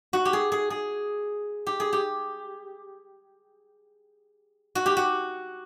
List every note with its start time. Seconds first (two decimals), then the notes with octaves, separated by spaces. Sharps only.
0.13 F#4
0.25 G4
0.33 G#4
0.52 G#4
0.70 G#4
1.67 G4
1.80 G#4
1.93 G4
4.75 F#4
4.86 G4
4.97 F#4